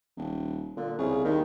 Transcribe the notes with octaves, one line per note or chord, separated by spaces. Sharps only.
D#1
A#2 D3
C2 C#3
D#2 D#3